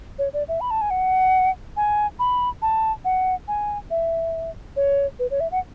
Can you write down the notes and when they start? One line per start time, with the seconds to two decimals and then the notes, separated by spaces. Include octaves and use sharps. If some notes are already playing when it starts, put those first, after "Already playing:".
0.19 C#5
0.33 D5
0.48 E5
0.61 B5
0.70 A5
0.81 G#5
0.90 F#5
1.77 G#5
2.19 B5
2.62 A5
3.05 F#5
3.48 G#5
3.90 E5
4.76 C#5
5.19 B4
5.30 C#5
5.40 E5
5.51 F#5